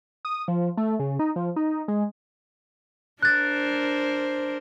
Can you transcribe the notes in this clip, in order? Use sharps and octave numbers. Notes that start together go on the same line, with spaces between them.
D#6
F3
A3
C#3
D#4
F3
D#4
G#3
D4 A#4 C5 F#6 A6